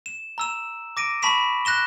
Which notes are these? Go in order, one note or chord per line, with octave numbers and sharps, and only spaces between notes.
E7
A#5 E6 E7
D6 A#6 D7 D#7
A5 B5 C#6 B6 E7
F#6 A#6 E7 G7